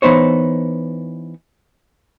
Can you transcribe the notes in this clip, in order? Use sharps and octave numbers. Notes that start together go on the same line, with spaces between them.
E3 B3 D#4 C5 C#5